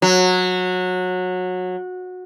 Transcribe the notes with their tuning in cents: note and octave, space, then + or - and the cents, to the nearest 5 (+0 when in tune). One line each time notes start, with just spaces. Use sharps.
F#3 -20